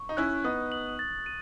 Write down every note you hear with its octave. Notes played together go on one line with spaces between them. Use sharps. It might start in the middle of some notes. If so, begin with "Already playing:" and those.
Already playing: C#6
D#4
C#4 E4 F#6
B3 D#4 D#6
F#7
A6
D#7